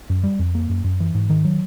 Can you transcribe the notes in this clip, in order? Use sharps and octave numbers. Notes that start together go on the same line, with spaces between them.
F#2
G3
F2
A#3
F#2
F#2
E3
G#2
D#3
F#3